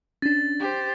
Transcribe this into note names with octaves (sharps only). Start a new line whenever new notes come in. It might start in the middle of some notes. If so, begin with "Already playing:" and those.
C#4 D4 A6
G4 C5